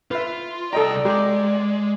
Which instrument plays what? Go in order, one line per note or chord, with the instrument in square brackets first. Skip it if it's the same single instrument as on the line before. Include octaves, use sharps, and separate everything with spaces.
[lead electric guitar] F4 [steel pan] B4 E5
[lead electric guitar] C2 G5 [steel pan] A4 D#5 A#5 [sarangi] D5
[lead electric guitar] G#3 [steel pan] G4 A#5